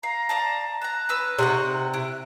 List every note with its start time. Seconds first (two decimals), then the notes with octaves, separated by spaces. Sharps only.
0.03 F5 A#5
0.29 D5 F5 A5
0.82 A5 A#5 F#6
1.09 C#4 B4 E6
1.39 C3 D#4 F#5 C#6
1.94 E4